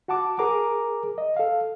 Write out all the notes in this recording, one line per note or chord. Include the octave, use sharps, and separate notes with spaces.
F#4 F#5 A5 D6
G#4 A#4 A#5 D6
D#5
A4 F5